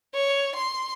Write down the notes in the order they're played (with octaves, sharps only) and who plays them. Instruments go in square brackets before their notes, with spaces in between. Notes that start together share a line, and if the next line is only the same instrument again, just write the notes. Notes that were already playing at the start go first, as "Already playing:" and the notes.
[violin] C#5
C6